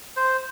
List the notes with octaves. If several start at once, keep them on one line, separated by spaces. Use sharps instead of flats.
C5